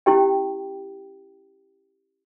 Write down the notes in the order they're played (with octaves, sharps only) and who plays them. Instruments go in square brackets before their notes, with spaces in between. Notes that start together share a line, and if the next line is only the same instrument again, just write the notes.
[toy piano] C#4 E4 G4 G5